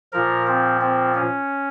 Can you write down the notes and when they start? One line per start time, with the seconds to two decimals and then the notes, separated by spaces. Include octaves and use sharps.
0.13 A#2 F3 A#4
0.47 C4
0.81 C4
1.14 C#4